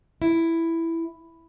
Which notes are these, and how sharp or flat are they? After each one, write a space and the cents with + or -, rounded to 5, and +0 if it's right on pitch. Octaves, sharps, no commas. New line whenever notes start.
E4 +5